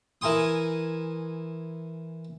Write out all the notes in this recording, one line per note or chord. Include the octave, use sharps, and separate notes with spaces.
E3 A#4 G#5 C6 D#6